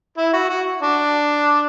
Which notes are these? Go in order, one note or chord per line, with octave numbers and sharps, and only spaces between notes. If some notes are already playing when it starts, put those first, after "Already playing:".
E4
F#4
F#4
D4